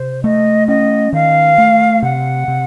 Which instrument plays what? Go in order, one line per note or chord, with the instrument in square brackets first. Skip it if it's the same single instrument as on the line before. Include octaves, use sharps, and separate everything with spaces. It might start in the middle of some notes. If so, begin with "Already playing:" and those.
Already playing: [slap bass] C3 [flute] C5
[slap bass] A3 [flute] D#5
[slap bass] C#4 [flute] D#5
[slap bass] D#3 [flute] F5
[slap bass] A3
[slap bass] C3 [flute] F#5
[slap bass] C3